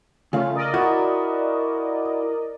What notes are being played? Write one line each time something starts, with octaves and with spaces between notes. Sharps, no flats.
C#3 A3 C#4 F4 F5
A#4 D5 D#5
E4 F#4